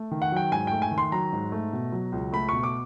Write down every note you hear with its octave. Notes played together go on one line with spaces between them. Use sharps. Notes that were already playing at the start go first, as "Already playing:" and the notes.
Already playing: A3
D#3
F#5
F#3 G5
G#2 G#5
A3 G5
G#5
D#3
C6
F#3 A#5
G#2
A3
B2
F#3
C#2
A3 B5
B2 C#6
D6